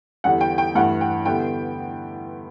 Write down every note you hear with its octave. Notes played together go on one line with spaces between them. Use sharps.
E2 D3 G3 F#5
G5
G5
G2 E3 A3 F#5
G5
D3 G3 B3 E4 G5